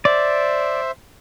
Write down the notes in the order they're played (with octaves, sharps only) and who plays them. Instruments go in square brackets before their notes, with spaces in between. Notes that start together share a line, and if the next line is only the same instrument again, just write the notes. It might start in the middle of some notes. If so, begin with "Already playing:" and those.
[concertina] C5 E5 [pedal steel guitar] D5